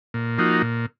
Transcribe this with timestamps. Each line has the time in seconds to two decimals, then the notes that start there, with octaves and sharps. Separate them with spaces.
0.14 A#2
0.38 F3 A#3 D#4 F#4
0.62 A#2